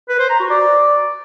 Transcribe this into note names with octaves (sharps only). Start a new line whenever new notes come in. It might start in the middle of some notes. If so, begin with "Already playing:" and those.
B4
C5
A#5
F#4
D5